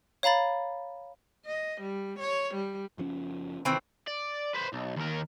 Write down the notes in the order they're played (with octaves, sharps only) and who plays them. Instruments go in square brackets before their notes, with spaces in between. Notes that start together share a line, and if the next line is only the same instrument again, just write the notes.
[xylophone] C#5 F5 A#5 B5 A6
[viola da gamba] D#5
G3
C#5
G3
[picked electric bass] F#1 F3 C#4
[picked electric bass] C3 D#3 [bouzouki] E3 A3 C4
[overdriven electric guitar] D5
B4 C5
B1
D#2 A#4